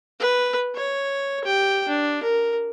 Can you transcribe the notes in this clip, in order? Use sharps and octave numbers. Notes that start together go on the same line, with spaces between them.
B4
C#5
G4 G5
D4
A#4